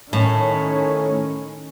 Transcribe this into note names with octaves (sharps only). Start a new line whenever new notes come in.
A2 D#3 C#4